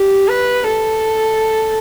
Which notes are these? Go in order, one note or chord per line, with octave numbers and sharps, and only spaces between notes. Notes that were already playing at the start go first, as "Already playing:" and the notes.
Already playing: G4
B4
A4